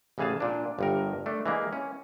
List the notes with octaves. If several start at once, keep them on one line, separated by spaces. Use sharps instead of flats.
A1 C#3 E3 G#4 F5 A5
A#2 D4
G1 G2 A#4
A3 D4
E3 G#3 A#3
C#4